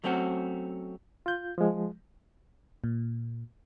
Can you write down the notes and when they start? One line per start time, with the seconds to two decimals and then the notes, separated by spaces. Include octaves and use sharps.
0.04 F#3 A3 C4 C#4 F#4
1.26 F4 G6
1.58 F3 G#3
2.84 A#2